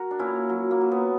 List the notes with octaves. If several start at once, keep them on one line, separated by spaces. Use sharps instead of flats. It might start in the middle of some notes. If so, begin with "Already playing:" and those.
Already playing: F#4 A#4
D4
A#2 C#4 E4
F#3
A#3
F#3
B3